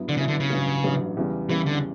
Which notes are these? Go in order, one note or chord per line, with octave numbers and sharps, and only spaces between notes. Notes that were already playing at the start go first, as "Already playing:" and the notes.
Already playing: G2 F#3 B3 E4
D3
G2 C#3 F#3 B3 E4
D3
C#3
A1 G2 F#3
A1 G2 F#3
E2 C#3 G3
E2 C#3 E3 G3
D3